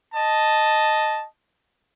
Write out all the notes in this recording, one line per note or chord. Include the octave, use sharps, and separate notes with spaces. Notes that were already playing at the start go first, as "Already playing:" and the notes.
D#5 A5